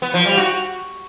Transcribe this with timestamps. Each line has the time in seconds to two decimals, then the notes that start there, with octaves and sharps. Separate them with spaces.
0.02 B3
0.14 F3
0.26 G3
0.37 F#4